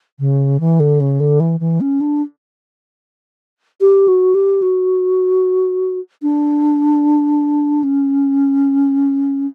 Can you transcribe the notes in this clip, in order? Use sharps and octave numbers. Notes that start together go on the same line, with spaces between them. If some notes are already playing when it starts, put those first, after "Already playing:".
C#3
E3
D3
C#3
D3
E3
E3
C#4
D4
G4
F#4
G4
F#4
D4
C#4